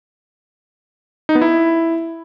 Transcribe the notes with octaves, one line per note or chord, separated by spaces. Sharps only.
D#4
B3
E4